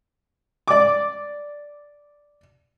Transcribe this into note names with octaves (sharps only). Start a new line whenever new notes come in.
D5 D6